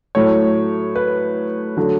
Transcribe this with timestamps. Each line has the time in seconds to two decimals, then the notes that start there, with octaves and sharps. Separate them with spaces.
0.15 A2 F#3 A3 C#5
0.96 B4
1.77 D3 F#3 A3